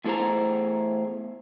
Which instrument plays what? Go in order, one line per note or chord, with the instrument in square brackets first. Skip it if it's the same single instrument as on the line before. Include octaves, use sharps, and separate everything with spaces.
[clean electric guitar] E2 A3 E4 G#4 C5 A#5